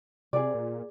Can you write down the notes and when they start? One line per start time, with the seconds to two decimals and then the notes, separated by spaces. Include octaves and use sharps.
0.33 C3 G#4 D5
0.55 A#2